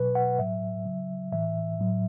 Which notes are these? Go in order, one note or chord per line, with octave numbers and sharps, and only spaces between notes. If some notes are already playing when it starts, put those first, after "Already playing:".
Already playing: B2 F#3 B4
F#5
A2 F#3 E5
C#3 F#3
A2 E3 E5
A2 F#3